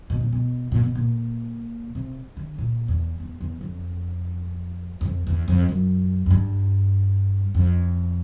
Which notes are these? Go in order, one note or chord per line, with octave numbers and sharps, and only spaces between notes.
B2
A#2
B2
A#2
B2
A#2
C3
D3
A#2
E2
E2
E2
F2
F#2
F2
E2
F2
F#2
F#2
G2
F2